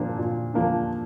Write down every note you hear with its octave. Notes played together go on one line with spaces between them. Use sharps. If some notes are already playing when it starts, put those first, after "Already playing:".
Already playing: A#2 F3 A#3 D4
A#2
F3 A#3 D4